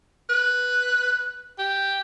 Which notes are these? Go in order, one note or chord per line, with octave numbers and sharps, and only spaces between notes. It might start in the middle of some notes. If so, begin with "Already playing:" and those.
B4
G4